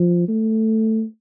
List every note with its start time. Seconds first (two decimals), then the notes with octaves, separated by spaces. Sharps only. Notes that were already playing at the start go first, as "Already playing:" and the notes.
Already playing: F3
0.28 A3